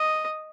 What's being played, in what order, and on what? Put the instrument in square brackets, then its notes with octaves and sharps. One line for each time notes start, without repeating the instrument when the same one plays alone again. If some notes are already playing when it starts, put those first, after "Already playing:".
Already playing: [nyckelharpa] D#5